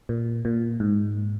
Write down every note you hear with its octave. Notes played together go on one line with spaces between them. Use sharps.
A#2
A#2
G#2